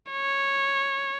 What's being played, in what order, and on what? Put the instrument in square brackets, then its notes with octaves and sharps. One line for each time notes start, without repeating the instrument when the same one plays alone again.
[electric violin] C#5